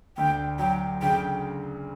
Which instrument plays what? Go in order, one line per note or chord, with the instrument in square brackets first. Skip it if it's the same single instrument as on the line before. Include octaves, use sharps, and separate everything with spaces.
[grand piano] D2 [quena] G5
[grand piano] F#3 [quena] G5
[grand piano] C#3 [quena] G5